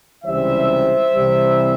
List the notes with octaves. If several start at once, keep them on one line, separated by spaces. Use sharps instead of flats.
C#2 C3 E3 G3 C5 E5
C2 C3 E3 G3